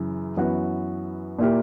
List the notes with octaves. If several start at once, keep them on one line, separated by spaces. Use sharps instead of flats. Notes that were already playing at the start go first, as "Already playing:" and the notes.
Already playing: F#2 C#3 E3
F#2 E3 B3 F#4
A#2 A#3 E4 G4